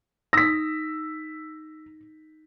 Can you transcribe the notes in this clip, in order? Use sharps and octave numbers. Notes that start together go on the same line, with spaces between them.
D#4 E6 A#6 B6